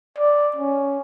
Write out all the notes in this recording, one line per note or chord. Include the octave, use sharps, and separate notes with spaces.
D5
C#4